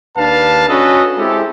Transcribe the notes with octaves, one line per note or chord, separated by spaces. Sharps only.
D#2 D4 B4 F5 A5
C#4 D4 F#4 A4 B4 D#5
G#3 C4 E4 G4 A4